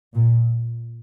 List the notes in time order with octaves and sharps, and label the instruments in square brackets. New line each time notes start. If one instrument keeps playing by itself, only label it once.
[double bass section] A#2